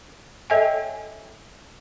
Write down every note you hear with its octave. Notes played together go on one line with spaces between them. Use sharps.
A4 C#5 D#5 E5 G5 G#5